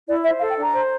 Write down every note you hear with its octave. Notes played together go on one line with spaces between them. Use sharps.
E4 D5
C5 E5
F5
A4
G5
D4 A#5
C5